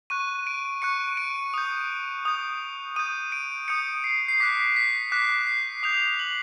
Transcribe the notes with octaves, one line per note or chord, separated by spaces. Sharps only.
C#6 F#6 D#7
D7
C#6 F#6 C#7
D7
D#6 G6
D#6 G6
D#6 G6 D#7
D7
D#6 G6 C#7
C7
C7
D6 F#6 B6
B6
D6 F#6 B6
C7
D#6 G6 F7
F#7